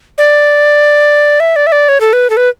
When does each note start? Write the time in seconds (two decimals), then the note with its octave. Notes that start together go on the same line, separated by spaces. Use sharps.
0.18 D5
1.40 E5
1.56 D5
1.67 E5
1.72 D5
1.89 C#5
2.01 A4
2.13 B4
2.30 A4
2.37 B4